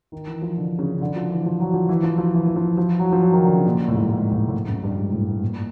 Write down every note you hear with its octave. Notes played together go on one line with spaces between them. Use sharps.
D#3
E3
F3
D3
C#3
D3
F3
E3
F3
F#3
F3
E3
F3
F3
E3
E3
F3
F3
F#3
F3
F#3
D#3
D3
C#3
A#2
A2
G#2
G#2
A2
A2
G#2
F#2
G2
G#2
A2
G#2
A#2